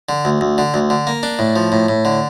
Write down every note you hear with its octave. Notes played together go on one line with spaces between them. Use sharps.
D3
D2
D2
D3
D2
D3
A#3
D4
A2
F3
A2
A2
D3